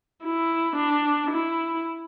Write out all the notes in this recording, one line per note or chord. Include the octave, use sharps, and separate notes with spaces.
E4
D4
E4